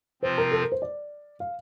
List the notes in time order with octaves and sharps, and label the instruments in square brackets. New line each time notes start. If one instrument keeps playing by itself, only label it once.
[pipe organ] C3 F3 C4 F4 [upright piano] C5
[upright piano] A#4
A4
A#4
C5
D5
F5